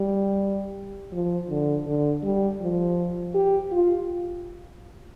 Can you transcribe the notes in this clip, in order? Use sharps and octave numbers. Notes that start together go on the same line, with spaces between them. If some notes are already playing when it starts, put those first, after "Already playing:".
Already playing: G3
F3
D3
D3
G3
F3
G4
F4